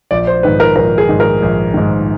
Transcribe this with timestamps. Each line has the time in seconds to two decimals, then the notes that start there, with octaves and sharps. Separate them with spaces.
0.11 A#1 D5
0.27 C5
0.43 G#2 D#3 B4
0.60 A#4
0.76 A#1 A#4
0.98 G#4
1.09 G#2 D#3
1.20 A#4
1.42 A#1
1.74 G#2 D#3